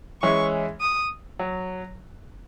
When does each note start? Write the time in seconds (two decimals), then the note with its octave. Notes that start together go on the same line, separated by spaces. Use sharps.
0.22 E3 G#3 C#4 E4 C#6
0.81 D#6
1.39 F#3